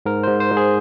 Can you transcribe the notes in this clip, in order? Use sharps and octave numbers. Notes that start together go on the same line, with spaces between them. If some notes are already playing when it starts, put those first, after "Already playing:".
G#2 A#4
G#2 C5
C5
G#2
G#4